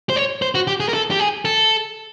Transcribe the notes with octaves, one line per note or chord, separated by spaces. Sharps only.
C5
C#5
C5
F#4
G4
G#4
A#4
A4
G4
G#4
A4